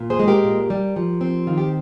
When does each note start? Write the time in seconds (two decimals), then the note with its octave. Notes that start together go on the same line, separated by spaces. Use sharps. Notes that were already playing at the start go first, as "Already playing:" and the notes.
Already playing: A#2
0.10 G#4 C5
0.19 G#3
0.28 G4 A#4
0.44 A#2
0.70 G3
0.96 F3
1.21 C4
1.47 D#3 F4
1.58 G4